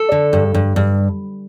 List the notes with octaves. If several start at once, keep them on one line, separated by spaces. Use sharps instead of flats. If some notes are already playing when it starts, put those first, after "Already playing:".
Already playing: A4
D3
G2
G2
G2